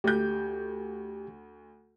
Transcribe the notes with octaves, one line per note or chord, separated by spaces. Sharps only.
D2 G4 G6